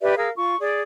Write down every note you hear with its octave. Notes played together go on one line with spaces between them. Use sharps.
G4 B4 D5 E5
G#4 A#4 F5 E6
F4 C#6
G#4 D5